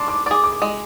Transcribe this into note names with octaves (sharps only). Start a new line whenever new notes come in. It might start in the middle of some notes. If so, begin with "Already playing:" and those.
Already playing: D4 C6
D6
G#4 D5 D6
D6
G#3